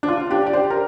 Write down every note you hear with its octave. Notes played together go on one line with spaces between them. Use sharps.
D4
F4
D4 G4
D5
G4 C5
A#4